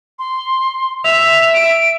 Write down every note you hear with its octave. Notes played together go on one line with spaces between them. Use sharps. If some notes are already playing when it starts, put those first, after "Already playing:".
C6
E5 F7
D7